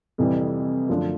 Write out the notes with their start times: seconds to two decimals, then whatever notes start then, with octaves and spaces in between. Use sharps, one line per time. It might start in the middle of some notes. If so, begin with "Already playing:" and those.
0.18 F2 C3 E3 G3
0.89 F#2 D3 F3 A3 D4